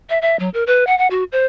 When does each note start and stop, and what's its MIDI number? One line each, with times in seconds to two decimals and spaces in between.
0.10 0.19 76
0.22 0.36 76
0.40 0.49 54
0.54 0.64 70
0.67 0.86 71
0.87 0.97 78
0.98 1.07 78
1.11 1.24 66
1.32 1.46 72